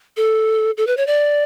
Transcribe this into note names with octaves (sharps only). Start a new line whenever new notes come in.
A4
A4
B4
C#5
D5